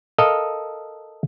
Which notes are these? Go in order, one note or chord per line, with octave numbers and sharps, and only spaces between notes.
A4 A#4 D#5 F5